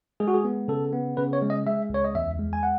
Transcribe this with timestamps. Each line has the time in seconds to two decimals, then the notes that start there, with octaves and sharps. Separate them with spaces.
0.20 G#3 G#4
0.28 F#4
0.34 G#4
0.44 B3
0.68 C#3 A4
0.92 B3
1.17 C#3 B4
1.33 C#5
1.42 G#3
1.50 D#5
1.67 G#3 E5
1.90 C#2 C#5
2.04 D#5
2.15 E2 E5
2.39 G#3
2.53 G#5
2.63 F#5